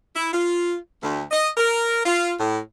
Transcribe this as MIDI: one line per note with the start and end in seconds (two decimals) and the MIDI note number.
0.14 0.31 64
0.33 0.75 65
1.02 1.22 38
1.31 1.48 75
1.57 1.99 70
2.05 2.32 65
2.38 2.58 45